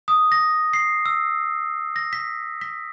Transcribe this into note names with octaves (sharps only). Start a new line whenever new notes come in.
D#6
A#6
C7
E6
A#6
B6
B6